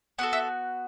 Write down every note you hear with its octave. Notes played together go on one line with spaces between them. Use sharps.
B3 F#4 A4 F#5
E5